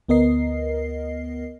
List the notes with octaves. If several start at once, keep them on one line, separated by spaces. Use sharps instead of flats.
D2 B3 A#4 D#5 C7